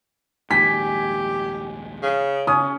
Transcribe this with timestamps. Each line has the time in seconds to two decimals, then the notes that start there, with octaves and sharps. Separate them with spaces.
0.51 A#1 D#2 G#2 G4 G#5 B6
2.03 C#3
2.47 C#3 C#4 D#6